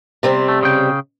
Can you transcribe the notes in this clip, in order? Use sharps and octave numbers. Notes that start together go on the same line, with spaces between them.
C3 G3 C4
A3
C#3 G5